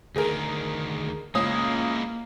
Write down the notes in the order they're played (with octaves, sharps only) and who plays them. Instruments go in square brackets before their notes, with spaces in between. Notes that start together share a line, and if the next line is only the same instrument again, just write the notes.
[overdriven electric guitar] D2 D#3 [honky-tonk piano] G#4 A#4
[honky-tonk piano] C#2 C#4 D#6 [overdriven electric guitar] G#3 E4 [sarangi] A#3